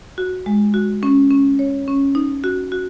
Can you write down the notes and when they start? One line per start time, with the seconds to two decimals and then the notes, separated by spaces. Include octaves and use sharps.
0.18 F#4
0.46 G#3
0.74 F#4
1.03 C#4
1.31 C#4
1.59 C#5
1.88 C#4
2.15 D#4
2.44 F#4
2.72 F#4